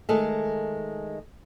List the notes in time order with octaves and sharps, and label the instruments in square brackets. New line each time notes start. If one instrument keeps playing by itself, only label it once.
[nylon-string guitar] D#3 G#3 A3 G#4 A4